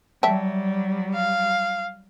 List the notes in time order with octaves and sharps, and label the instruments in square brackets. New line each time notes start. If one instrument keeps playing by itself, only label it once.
[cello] F#3 G3 [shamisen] E5 G5 A5
[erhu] F5